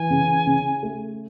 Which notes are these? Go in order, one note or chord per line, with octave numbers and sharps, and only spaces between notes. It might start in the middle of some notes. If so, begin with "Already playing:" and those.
Already playing: E3 G#5
C#3
C#3
A3